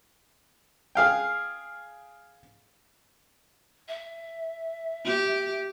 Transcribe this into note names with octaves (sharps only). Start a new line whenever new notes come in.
G#4 F5 G5
E5
G4